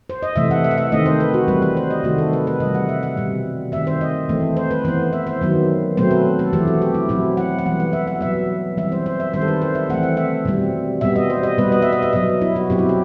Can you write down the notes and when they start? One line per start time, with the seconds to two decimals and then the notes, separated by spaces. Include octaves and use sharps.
0.10 C5
0.23 D#5
0.36 C3 E3 A3 E5
0.51 F#5
0.64 E5
0.71 F#5
0.78 E5
0.92 D#3 A3 C4 D#5
1.06 C5
1.20 B4
1.34 F#4
1.48 E3 G3 C4 B4
1.62 B4
1.77 C5
1.90 D#5
2.04 C3 D#3 A3 F#4
2.18 A4
2.33 B4
2.47 B4
2.60 C3 E3 G3 D#5
2.75 F#5
2.89 E5
3.03 F#5
3.17 B2 G3 C4
3.72 D#3 A3 C4 E5
3.87 C5
4.01 D#5
4.29 E3 A3 C4
4.57 C5
4.71 B4
4.85 E3 B3 C5
5.13 E5
5.27 C5
5.41 D#3 F#3 B3
5.97 B2 F#3 A3 C4 C5
6.11 B4
6.39 A4
6.53 E3 A3 C4 G4
6.67 F#4
6.82 G4
6.95 E4
7.09 B2 F#3 C4 E4
7.37 F#5
7.59 F#5
7.65 E3 G3 B3
7.80 F#5
7.93 E5
8.07 F#5
8.21 B2 F#3 B3 E5
8.77 E3 G3 C4 E5
8.92 C5
9.06 C5
9.20 E5
9.34 D#3 G3 C4 C5
9.42 A4
9.48 B4
9.62 C5
9.75 E5
9.90 E3 A3 C4 F#5
10.03 F#5
10.17 E5
10.45 B2 G3 C4
11.01 B2 G3 B3 E5
11.16 D#5
11.30 C5
11.43 D#5
11.58 B2 G3 B3 B4
11.72 D#5
11.82 E5
11.92 D#5
12.02 E5
12.13 B2 F#3 B3 D#5
12.42 E4
12.56 F#4
12.70 B2 F#3 C4 G4
12.79 E4
12.89 G4